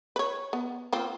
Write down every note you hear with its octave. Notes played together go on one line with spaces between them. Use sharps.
B4 C#5
B3
A#3 C4 F4